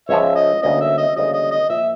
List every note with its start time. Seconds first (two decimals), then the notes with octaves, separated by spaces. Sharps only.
0.09 C#2 C#3 F3 C#5 E5
0.35 D#5
0.63 D2 D3 G3 A#3 C#4 D#5
0.81 E5
0.98 D#5
1.16 D2 C#3 E3 G3 A#3 D#5
1.33 D#5
1.51 D#5
1.70 A#2 F3 A#3 E5